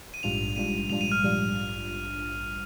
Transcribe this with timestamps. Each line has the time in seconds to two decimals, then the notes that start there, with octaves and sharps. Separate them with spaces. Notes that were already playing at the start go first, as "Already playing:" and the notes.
0.14 D#7
0.23 A#1 G#2 G3 D4 F4 F7
0.56 A#1 G#2 G3 D4 F4 D#7
0.90 A#1 G#2 G3 D4 F4 F7
1.01 D#7
1.12 F6
1.23 A#1 G#2 G3 D4 F4